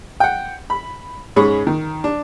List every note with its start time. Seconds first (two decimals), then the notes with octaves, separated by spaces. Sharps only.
0.20 F#5 G5
0.70 B5
1.36 G#2 G#3 C#4 G#4 B5 C#6
1.67 D#3
2.04 D4